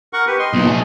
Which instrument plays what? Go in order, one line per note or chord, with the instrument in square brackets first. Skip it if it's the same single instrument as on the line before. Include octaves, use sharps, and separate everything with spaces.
[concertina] A#4 F#5 C#6
G4 B4
D#5 C6
[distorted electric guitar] B1 A#2
A3 G#4